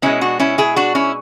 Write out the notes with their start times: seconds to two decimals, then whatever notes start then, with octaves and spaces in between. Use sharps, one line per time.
0.02 B2 G#3 C#4 E4
0.21 D4 F#4
0.40 C#4 E4
0.58 E4 G#4
0.76 D4 F#4
0.95 C#4 E4